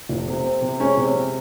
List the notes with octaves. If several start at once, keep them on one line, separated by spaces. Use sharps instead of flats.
F1
C3
C4
C3
G#3 C#4
C3
C3